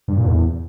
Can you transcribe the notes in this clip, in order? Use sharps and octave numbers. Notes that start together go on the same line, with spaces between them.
G2
A#2
E2